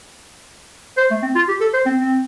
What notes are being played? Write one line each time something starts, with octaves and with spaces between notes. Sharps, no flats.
C5
A3
C4
F4
G4
A4
C5
C4
C4